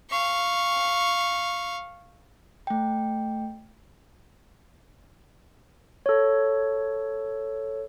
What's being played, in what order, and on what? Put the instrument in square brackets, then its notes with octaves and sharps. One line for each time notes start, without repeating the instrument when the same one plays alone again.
[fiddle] F5 C#6
[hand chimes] A3 G5
[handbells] A4 C#5